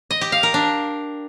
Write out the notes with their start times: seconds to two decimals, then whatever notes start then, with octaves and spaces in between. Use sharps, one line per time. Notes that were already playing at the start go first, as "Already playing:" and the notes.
0.11 D#5
0.21 G4
0.32 F5
0.43 A#4
0.54 D4